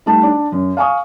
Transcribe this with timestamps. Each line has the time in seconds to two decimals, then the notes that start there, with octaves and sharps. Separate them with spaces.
0.06 G3 A3 D#4 A5
0.23 D4 D5
0.52 F#2
0.77 F5 G#5 C#6 D#6